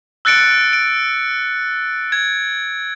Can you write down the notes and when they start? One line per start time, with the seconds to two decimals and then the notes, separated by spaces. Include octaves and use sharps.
0.25 E6 F#6 A6 C#7 D7
0.73 D7
2.12 G#6